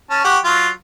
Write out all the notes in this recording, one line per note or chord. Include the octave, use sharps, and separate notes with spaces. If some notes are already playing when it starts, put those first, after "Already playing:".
C#4 A5
G4 F#5 C#6
F#3 F4